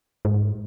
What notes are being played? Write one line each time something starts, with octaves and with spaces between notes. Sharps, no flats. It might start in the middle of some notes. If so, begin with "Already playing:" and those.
G#2